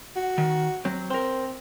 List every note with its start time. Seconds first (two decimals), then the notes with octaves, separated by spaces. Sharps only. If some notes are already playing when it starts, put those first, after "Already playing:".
0.16 F#4
0.38 D#3
0.85 F#3 C4
1.10 C4 A#4 C5